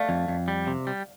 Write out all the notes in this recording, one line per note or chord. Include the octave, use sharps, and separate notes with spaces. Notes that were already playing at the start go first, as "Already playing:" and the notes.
Already playing: A3 D5 F5
F2
F2
G3
C3
G3